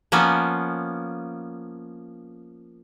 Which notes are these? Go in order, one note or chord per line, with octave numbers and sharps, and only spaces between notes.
F3 A#3 B3 C#4